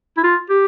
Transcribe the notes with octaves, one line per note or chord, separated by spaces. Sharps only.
E4
F4
G4